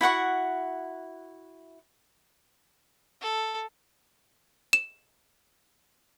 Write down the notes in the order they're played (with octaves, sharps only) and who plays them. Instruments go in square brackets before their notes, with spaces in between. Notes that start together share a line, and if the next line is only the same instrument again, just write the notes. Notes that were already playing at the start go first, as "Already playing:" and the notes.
[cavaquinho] E4 F#4 F#5 C#6
[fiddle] A4
[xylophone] E7